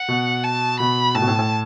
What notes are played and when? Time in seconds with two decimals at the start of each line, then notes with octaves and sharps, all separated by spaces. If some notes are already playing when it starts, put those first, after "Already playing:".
Already playing: F#5
0.08 B2
0.44 A5
0.80 B2 B5
1.15 A2 A5
1.22 B2
1.28 A2
1.39 A2